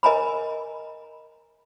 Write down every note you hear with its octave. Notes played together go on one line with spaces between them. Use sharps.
A#4 D#5 G#5 A#5 B5